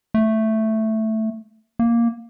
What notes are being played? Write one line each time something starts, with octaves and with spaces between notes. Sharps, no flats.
A3
A#3